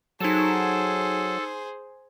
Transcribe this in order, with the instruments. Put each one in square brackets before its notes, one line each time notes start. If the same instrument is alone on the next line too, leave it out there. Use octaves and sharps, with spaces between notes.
[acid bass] F#3 [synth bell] D#4 E7 [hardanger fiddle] G#4 C5 [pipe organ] A4